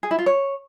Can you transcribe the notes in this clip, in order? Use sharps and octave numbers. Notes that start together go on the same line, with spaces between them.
G#4
E4
F4
C#5